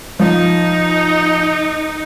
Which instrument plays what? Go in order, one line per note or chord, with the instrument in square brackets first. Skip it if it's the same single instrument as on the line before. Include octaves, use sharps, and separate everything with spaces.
[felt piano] F3 [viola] D#4